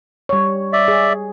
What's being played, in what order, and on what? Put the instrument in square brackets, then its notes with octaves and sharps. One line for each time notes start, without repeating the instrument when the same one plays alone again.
[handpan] G3 C#5
[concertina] D5 E5
[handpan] G#4